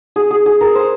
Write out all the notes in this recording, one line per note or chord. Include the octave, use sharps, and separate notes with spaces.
G#4
G#4
G#4
A#4
C5